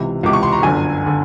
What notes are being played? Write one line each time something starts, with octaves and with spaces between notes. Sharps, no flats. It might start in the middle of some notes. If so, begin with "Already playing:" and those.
Already playing: C#2 C3 E3
C#2 C3 E3 D6
C#6
C6
A#5
G1 F#2 D3 G#5
D3